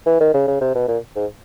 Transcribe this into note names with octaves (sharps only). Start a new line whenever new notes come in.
E3
D#3
C#3
C#3
C3
B2
A#2
G#2